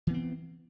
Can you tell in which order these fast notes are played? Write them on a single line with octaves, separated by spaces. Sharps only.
E3 B3 C4